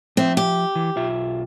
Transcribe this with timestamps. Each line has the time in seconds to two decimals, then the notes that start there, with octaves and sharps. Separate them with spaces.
0.17 F3 C4 E5
0.37 G4
0.76 E3
0.97 B1 F4 E5